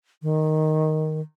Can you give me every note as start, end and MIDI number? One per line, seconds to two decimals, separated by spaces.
0.22 1.21 51